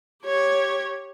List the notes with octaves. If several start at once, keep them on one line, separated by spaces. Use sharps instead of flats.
G4 C#5